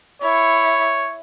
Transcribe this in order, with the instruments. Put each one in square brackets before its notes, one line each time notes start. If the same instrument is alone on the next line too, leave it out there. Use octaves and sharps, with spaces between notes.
[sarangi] E4 [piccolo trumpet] C#5